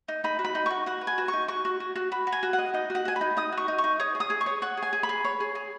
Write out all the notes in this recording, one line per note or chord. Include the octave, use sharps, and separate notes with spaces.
D#4
D#4 B5
F#4
B5
D#4
F#4 C#6
F#4 F#5
B4
G#5
F#4
C#6
D#4
F#4 C#6
F#4
F#4
F#4
F#4 B5
F#4
G#5
F#4
F#5
D#5
D#4 D#5
F#4 F#5
F#4 G#5
B5
D#4
D#4 D#6
F#4
C#6
D#4
C#6
D#4
C#5 D#6
G#4
D#6
G#4
C#6
C#5
C#5 F#5
G#4
G#5
G#4
B5
G#4
C#5
G#4
G#4